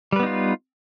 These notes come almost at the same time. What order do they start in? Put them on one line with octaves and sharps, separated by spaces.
G3 B4 B3 D#4 F4